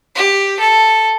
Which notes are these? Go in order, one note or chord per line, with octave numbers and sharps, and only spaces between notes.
G4
A4